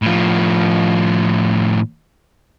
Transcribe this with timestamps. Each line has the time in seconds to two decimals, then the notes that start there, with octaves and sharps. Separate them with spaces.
0.02 A2 F3